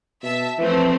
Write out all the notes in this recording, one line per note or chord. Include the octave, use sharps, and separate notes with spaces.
B2 E5 A5
E3 F3 A3 C4